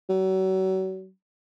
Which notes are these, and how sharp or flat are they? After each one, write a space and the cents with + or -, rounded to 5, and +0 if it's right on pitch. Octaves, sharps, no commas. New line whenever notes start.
F#3 +35